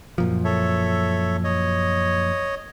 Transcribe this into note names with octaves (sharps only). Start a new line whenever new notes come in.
F#2 A#2 F3
A4 C#5 E5
C#5 D#5